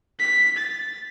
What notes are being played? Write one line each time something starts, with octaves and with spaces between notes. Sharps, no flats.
B6
A6